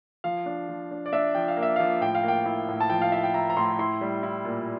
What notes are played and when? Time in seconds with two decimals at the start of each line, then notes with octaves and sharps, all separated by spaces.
0.24 F3 F5
0.46 D4
0.69 F3
0.91 D4
1.06 D5
1.13 D4 E5
1.35 F3 G5
1.48 F5
1.57 A#3
1.63 E5
1.76 F3 F5
2.01 A2 G5
2.15 F5
2.23 A#3 G5
2.45 E4
2.68 A2
2.80 A5
2.90 F3 G5
3.02 F5
3.12 E4 E5
3.24 G5
3.34 E4 A#5
3.50 A#5
3.57 A2 C6
3.79 E4 C6
4.01 G3
4.23 E4
4.45 A#2